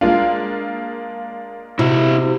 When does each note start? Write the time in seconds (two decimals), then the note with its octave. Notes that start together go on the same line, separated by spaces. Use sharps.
0.01 G#3 A#3 D4 F4
1.79 C3 E4 F#4 E5